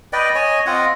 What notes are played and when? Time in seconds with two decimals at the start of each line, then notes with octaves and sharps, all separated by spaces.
0.13 B4 D5 D#5 G5
0.35 C#5 D#5 G#5
0.66 C4 F4 D#5 F#5